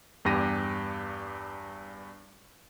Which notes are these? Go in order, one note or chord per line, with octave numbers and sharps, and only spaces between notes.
E2 G2 G4 A#6 D#7